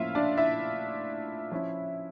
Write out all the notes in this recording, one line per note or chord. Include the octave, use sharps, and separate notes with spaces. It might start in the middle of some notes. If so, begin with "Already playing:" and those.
Already playing: A2 F3 A#3 C#4 E4 F4 E5 F5
D4 D5
E4 E5
F3 C#4 E4